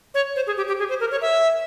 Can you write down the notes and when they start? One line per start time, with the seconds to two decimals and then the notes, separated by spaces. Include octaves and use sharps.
0.14 C#5
0.36 C5
0.47 G#4
0.57 G4
0.68 G4
0.79 G#4
0.89 C5
1.00 A#4
1.11 C#5
1.21 E5